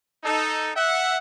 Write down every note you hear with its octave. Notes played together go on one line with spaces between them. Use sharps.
D#4 A4
E5 F#5